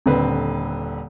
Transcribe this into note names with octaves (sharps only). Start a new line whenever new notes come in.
D#1 D3 C4 B4